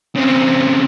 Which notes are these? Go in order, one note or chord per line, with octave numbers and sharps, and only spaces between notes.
C#3 C4